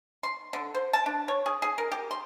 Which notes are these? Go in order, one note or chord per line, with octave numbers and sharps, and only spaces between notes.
C6
D3
C5
A5
D4
C#5
G#4
G#4
A#4
G4
C6